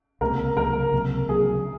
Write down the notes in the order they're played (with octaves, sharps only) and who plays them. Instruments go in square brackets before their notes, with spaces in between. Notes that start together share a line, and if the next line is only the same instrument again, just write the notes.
[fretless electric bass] C#2 C3 F#3 A#3 [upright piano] A#4
[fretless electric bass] C#2 C3 F#3 A#3 [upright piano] A#4
[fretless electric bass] C#2 C3 F#3 A#3
[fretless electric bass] C#2 C3 F#3 A#3 [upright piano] G#4